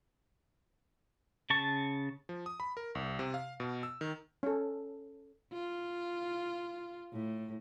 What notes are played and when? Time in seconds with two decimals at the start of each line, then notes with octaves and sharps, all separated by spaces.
1.50 C#3 A5 C#6
2.29 F3
2.46 D#6
2.60 B5
2.77 A#4
2.95 C2
3.19 C3
3.34 F5
3.60 B2
3.83 E6
4.01 D#3
4.43 C#4 A4
5.53 F4
7.12 A2